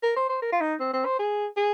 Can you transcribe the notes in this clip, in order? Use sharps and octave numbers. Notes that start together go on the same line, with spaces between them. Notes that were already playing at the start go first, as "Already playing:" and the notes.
A#4
C5
C5
A#4
F4
D#4
C4
C4
C5
G#4
G#4